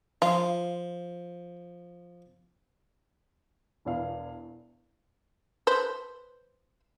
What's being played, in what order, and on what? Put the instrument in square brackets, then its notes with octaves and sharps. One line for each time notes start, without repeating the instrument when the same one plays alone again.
[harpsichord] F3 [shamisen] F4
[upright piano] E1 E2 D4 E4 F5
[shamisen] B4 C5